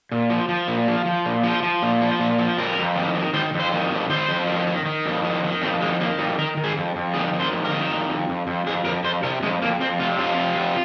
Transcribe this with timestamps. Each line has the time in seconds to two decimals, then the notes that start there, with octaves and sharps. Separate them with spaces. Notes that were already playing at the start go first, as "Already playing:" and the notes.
0.12 A#2
0.30 F3
0.49 F3
0.68 A#2
0.87 F3
1.06 F3
1.26 A#2
1.43 F3
1.63 F3
1.82 A#2
2.01 F3
2.19 A#2
2.38 F3
2.58 F2 A#4
2.78 F2
2.96 D#3
3.14 D#3
3.33 D#3 C5
3.53 F2
3.60 C5
3.72 D#3
3.91 F2
4.10 D#3 C5
4.29 F2
4.48 D#3
4.67 D#3
4.86 D#3
5.06 F2
5.24 D#3
5.44 D#3
5.62 F2 C4
5.81 D#3 G#3
6.00 D#3 A#3
6.19 F2 D#4
6.39 D#3 A#4
6.57 D#3
6.64 G#4
6.77 F2
6.96 F2
7.14 D#3 G#4
7.33 D#3
7.40 C5
7.52 F2
7.65 A#4
7.71 D#3
7.91 F2
8.09 F2
8.29 F2
8.47 F2
8.66 F2 G#4
8.85 F2 A#4
9.04 F2 C5
9.23 C3 A#4
9.42 F2 G#3
9.62 F2 A#3
9.80 F2 C4
9.99 C3 F4
10.19 F2 F4
10.38 C3
10.57 F2